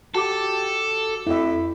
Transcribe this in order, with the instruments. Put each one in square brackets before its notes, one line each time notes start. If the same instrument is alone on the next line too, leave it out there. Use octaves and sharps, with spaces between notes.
[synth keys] F#4 D6 [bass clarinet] G4 [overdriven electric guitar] A4
[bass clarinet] F2 [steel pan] E4 E5